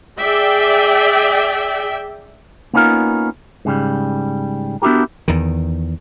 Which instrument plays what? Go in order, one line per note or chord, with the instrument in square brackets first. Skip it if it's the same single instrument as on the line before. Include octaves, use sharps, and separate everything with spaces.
[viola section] G#4 D5 E5 G5
[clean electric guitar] A#3 B3 C#4 D#4 F4 A#4
G#2 C#3 G3
B3 D4 E4 F#4 G4 A#4
[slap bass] E2 D#3